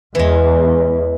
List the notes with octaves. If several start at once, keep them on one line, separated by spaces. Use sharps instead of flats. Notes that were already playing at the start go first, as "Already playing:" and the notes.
E2 E3 G#3